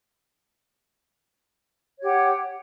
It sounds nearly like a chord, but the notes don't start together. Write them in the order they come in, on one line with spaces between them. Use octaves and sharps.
C#5 G4 F#5